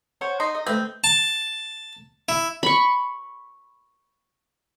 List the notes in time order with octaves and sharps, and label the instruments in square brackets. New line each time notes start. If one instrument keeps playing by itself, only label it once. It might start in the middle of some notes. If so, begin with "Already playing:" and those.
[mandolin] C5 C#5 F#5
[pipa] D#4 [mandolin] C6
[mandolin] D#5
[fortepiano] A3 B4 [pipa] C4
[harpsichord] A5
E4
[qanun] B5 C#6